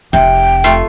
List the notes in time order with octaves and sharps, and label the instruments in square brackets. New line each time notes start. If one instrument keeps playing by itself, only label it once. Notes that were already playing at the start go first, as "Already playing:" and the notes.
[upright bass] F1 [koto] C3 [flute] G5
[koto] A3 F4